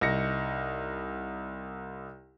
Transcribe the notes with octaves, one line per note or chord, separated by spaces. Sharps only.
C2 D#4 A#6 C#7